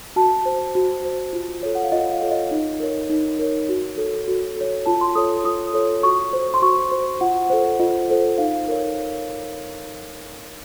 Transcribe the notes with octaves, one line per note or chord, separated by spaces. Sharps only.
F#4 A5
C5
F#4
C5
F4
A4 C#5
F#5
F5
F4 D#5
F5
A4 C#5
D#5
D#4
A#4 C#5
D#4
A#4 C#5
F#4
A4 C#5
F#4
A4 C#5
F4 A5
C6
A4 C#5 D#6
F4 D#6
A4 C#5
F#4 C#6
C5
C6
F#4 C#6
C5
F4 F#5
A4 C5
F4 D#5
A4 C5
D#4 F5
A#4 C#5